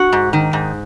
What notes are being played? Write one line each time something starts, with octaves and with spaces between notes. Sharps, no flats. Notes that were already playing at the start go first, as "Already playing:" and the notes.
Already playing: F#4
G#2
D#3
G#2